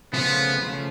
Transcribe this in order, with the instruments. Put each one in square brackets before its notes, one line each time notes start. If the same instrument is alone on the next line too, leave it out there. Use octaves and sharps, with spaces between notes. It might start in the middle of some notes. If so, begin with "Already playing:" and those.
[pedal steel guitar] C#3 F3 A3 C#4 F4 [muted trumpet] B3
[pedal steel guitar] C#3 F3 A3 C#4 F4